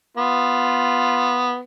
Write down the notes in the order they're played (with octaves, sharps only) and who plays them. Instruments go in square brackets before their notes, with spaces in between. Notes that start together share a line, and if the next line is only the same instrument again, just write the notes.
[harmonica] B3 [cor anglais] F4